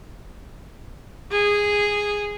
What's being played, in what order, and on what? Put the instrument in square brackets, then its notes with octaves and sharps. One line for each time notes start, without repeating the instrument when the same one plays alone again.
[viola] G#4